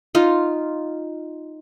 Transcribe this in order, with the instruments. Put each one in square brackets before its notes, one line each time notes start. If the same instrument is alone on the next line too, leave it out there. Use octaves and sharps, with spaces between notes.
[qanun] D#4 F4